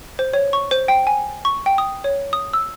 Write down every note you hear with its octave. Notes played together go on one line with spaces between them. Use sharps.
C5
C#5
C#6
C5
G5
G#5
C#6
G5
D#6
C#5
D#6
E6